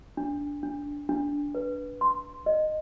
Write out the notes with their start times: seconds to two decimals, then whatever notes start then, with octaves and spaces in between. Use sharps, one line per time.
0.17 D4
0.63 D4
1.09 D4
1.55 B4
2.01 C6
2.46 D#5